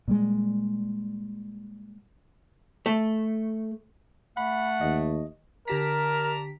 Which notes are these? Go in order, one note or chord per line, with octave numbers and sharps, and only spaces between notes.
A#2 G3 G#3
A3
A3 F#5 B5
D#2 D#5
D3 G4 A#4 D5 A5 A#5 B6